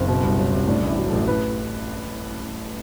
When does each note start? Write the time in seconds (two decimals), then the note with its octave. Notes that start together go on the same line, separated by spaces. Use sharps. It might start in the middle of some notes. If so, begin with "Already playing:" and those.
Already playing: F#1 C4
0.08 B2
0.23 C2
0.38 F#3
0.53 C2
0.68 A2 D4
0.82 A1
0.88 E4
0.98 F#3
1.08 A4
1.13 A1
1.28 A2 B4